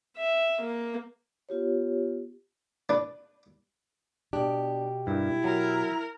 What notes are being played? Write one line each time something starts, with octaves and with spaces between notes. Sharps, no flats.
E5
A#3
B3 F4 G4 C#5
D4 B4
B2 D4 G4
G2 E4 A#4 G5
F#3 A#4